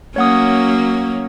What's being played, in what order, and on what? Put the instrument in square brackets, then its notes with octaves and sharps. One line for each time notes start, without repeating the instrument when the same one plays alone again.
[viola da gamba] F#3 A#3 C#4 [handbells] C#5 F#5 D#6